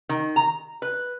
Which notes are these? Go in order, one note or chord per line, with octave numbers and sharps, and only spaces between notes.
D#3
A#5
B4